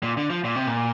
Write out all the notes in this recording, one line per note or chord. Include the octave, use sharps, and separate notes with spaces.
A#2
D3
F3
A#2
C3
A#2